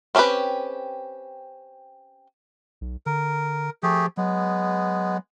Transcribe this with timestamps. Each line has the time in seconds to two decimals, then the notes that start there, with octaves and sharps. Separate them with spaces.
0.15 C4 C#4 E4 G4 B4
2.81 B1
3.06 D3 A#4
3.83 F3 A3 G4 G#4
4.17 F#3 G#3 B3